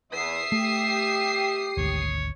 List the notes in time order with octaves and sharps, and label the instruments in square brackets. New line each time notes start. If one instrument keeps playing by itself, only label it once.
[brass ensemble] E2 [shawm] E5 [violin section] D#6 C7
[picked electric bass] A3 [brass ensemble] G4
[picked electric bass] G#1 D2 [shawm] C#5